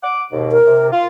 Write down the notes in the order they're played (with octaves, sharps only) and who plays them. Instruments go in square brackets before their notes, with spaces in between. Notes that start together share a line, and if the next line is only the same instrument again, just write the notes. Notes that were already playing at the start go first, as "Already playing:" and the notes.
[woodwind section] F#5 D6
D#2 G#2 B2
[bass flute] A#4
[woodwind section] C3
F4